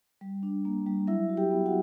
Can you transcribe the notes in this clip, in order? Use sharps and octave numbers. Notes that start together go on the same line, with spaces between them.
G3
D4
A#3
G3
F#3 E4 E5
F#4
G4 G5
B3
F#4 F#5